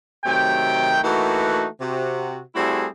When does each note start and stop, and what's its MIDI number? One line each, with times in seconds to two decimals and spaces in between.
0.25 0.98 48
0.25 0.98 51
0.25 0.98 54
0.25 0.98 57
0.25 0.98 79
1.03 1.66 52
1.03 1.66 57
1.03 1.66 58
1.03 1.66 63
1.03 1.66 66
1.80 2.40 48
1.80 2.40 66
2.55 2.86 55
2.55 2.86 57
2.55 2.86 60
2.55 2.86 64
2.55 2.86 66
2.55 2.86 68